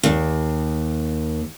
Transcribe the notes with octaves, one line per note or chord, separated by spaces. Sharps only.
D#2